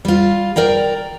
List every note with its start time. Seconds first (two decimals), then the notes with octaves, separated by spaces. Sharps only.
0.05 G3 F4
0.56 A#4 D5 G5 A#5